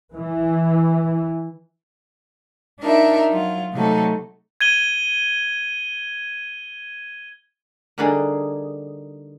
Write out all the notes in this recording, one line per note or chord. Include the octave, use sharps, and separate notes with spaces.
E3
D4 D#4 F4 A#4 E5
F#3 F4
C3 F#3 A3 D#4 A4
G#6 D#7 G7
D3 G3 A#3 D4 D#4 G#4